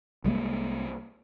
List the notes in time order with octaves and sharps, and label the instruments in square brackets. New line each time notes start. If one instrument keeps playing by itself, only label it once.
[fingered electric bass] C2 G3 G#3 A#3